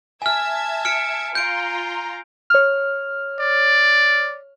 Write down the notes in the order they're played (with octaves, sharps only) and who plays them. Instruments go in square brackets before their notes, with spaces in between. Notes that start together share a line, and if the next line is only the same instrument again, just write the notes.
[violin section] E5 A5 G#6 [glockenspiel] G#5 F6
[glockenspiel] F6 C#7 D7
[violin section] F4 A#5 C6 [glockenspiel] G6 D7
[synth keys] C#5 F6
[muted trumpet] D5